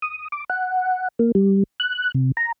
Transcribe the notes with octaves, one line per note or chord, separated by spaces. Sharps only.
D#6
D6
F#5
A#3
G3
F#6
C3
A#5